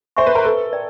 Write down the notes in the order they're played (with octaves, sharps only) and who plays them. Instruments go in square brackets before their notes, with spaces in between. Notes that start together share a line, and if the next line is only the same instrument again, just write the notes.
[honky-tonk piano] C5 [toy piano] E5 G#5 C#6
[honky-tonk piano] B4
A#4
[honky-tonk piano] A4 [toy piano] B4
[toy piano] D5 G5